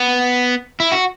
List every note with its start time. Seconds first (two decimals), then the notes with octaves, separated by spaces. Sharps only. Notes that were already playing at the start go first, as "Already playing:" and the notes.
Already playing: B3
0.80 E4
0.92 F#4